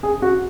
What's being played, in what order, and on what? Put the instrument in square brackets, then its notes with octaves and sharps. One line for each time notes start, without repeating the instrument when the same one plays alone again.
[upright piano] G#4
F#4